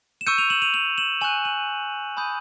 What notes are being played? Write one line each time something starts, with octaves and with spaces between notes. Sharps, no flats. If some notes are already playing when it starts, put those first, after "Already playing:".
E7
C#6 E6 G6 C#7 D#7
D#7 F7
E7 F#7
D#7 F7
D#7 F7
E7 F#7
G#5 C#6 F#6 E7 F#7
E7 F#7
G#5 B5 D#6 G6